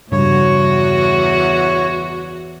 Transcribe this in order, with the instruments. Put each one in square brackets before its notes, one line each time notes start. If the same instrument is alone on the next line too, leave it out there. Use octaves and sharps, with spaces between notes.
[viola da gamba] E2 F#4 [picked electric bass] G2 C#3 G3 [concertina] C#5